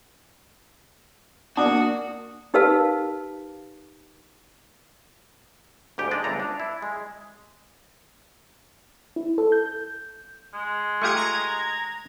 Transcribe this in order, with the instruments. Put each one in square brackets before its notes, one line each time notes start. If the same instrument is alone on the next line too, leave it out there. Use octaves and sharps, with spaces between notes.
[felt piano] A#3 D4 [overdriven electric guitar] F#4 [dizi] D#6
[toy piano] D#4 G4 A#4 B4 F5 A5
[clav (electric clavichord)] D2 G#2 G4 G5
G#3 D4 G#4 D5 D#5
G1 C#2 E3 A4 A#5
D4
E4
G#3
[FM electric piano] E4
A4
G6
[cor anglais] G#3
[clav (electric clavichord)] A3 F4 G4 [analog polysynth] C#6 D#6 G#6
[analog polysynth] A#5 G#6